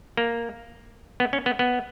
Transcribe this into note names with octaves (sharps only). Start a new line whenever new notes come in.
A#3
B3
C#4
B3
B3